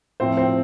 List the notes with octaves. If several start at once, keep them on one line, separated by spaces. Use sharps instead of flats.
A2 F3 C4 C5
C4 C5